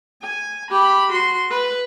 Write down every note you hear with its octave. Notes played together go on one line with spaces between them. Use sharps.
G#5
G4 B5
F#4 C6
B4